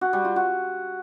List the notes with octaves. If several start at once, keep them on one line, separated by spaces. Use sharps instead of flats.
F#4
G3
F4
F#4